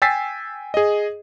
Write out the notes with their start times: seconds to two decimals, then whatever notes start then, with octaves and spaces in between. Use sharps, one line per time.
0.02 G5 G#5 E6 A6 B6 C7
0.74 G#4 D#5